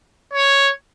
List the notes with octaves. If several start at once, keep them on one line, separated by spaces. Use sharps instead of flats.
C#5